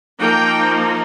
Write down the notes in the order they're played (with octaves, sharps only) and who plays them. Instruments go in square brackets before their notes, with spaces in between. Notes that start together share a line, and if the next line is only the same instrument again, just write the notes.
[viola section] F3 A#3 D#4 G5